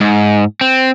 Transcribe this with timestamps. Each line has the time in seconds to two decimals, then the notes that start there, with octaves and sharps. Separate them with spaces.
0.01 G#2
0.61 C4